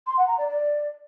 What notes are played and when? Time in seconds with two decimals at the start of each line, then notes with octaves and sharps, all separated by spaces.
0.07 C6
0.17 F#5
0.28 A#5
0.38 D5
0.48 D5